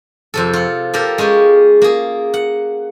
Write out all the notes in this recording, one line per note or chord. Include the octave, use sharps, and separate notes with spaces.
F2 C3 A4
F4 F#5
A#3 G4 A4 A#4
G#3 C#4 F4 G4
A#3 G#4
F#5